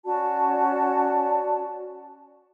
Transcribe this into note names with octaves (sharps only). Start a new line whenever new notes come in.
C#4 F#4 D5 A5